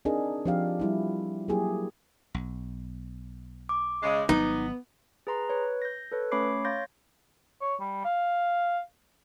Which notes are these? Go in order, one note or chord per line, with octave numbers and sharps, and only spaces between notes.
C4 D4 D#4 G#4 A#4 D#5
F3 C4 D4 G4 D5 F5
G3 E4 F4
F#3 A#3 E4 G4 G#4
B1
D6
C#3 G#3
G#1 F#3 G3 B3 D#4
G#4 B4 A#5 C6
B4 C#5
G6 A#6
A4 B4 C#5
A3 C#4 C#5 B5 D6 C7
C#5 F5 C6 G6 A6 A#6
C#5
G3
F5